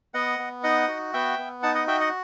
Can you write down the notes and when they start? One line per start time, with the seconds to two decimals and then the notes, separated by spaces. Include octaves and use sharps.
0.14 B3 D#5 F#5
0.39 B3
0.63 D#4 D#5 F#5
0.88 F#4
1.14 B3 E5 G5
1.38 B3
1.63 D#4 F#5 A5
1.75 D#5 F#5
1.87 F#4 E5 G5
2.00 D#5 F#5